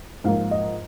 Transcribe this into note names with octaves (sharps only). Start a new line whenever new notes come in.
G#2 F3 A#3 F5
D#5